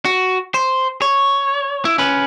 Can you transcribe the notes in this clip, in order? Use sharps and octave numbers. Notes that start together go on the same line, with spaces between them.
F#4
C5
C#5
E4
C#4 B4